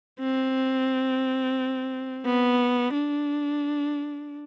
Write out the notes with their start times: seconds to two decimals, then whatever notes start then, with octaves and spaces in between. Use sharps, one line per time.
0.20 C4
2.25 B3
2.94 D4